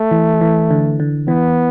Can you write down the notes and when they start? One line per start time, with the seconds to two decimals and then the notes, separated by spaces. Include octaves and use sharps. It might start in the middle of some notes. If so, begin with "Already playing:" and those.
Already playing: A3
0.11 E3
0.41 E3
0.71 D3
1.00 D3
1.28 E3 B3